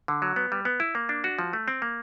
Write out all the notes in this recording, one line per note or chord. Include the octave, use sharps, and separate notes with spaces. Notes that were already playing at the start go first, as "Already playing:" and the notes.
D3
F#3
B3
G3
B3
E4
A#3
D4
F#4
F3
A3
C4
A#3